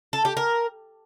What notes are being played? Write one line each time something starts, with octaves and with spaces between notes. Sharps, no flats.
A4
G4
A#4